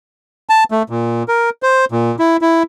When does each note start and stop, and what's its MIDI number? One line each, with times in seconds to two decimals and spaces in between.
0.49 0.64 81
0.71 0.83 57
0.90 1.23 46
1.28 1.50 70
1.63 1.85 72
1.92 2.15 46
2.19 2.37 64
2.41 2.63 64